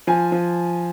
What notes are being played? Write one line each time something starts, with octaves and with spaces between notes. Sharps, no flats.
F3 G#5
F3